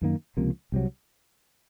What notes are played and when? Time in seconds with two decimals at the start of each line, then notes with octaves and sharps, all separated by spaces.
0.02 F#2 D#3 A#3
0.37 C#2 C3 F3 A#3
0.72 C2 C3 F#3